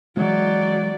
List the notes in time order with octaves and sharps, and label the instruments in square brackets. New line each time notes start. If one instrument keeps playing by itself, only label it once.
[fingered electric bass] E3 G#3 [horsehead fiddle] F#3 D5